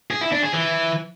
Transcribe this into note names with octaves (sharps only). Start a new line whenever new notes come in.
G#4
E4
D4
G#4
E3